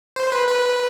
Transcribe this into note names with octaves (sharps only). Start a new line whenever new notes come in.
C5
B4
B4